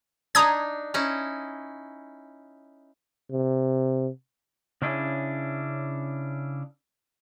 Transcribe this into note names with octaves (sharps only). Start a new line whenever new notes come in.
D4 D#4 A#5 D#6 G#6
C#4 D#4 E4
C3
C#3 C#4 D4 E4 G#4